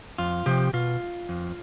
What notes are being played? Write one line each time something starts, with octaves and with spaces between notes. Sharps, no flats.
F2 F4
C3 F3 G4
B2 F4
F2